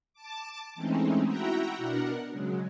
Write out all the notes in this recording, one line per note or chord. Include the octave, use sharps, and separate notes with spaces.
A5 D6
E3 G#3 A3 C4 C#4 D#4
E4 F#4 E5 F#5 G5 A#5
B2 D4 A#4 F#5
C#3 F#3 G#3